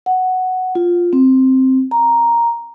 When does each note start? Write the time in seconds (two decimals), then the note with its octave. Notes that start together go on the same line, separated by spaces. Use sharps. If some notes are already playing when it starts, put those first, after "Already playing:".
0.06 F#5
0.75 F4
1.13 C4
1.91 A#5